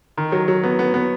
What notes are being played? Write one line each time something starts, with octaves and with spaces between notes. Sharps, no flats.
D#3
F#3
F#3
B3
B3
B3